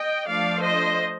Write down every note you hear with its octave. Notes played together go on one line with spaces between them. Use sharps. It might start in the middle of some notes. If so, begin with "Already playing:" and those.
Already playing: D#5 G5
F3 A3 D4 D5 F5
C5 D#5